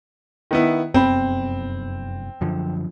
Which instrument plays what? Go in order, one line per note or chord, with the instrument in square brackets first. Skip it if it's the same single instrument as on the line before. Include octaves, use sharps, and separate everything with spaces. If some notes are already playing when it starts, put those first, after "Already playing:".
[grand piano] D#3 B3 E4
[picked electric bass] F1 F#2 B3 [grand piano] C4 B5
[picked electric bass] F#2 D3 F3